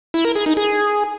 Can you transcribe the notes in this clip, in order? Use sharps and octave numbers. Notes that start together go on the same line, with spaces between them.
E4
A#4
G#4
D#4
G#4